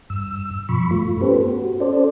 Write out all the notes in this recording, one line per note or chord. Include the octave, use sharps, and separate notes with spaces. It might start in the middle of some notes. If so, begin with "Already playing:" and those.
G2 E6
G2 B2 F3 B5 C#6
G2 A3 F4
B3 C#4 G4 A4 B4 C5
F#4
C#4 A4 C5 D5